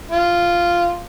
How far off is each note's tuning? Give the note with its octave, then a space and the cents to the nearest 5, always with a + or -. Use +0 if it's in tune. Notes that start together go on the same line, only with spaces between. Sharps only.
F4 -5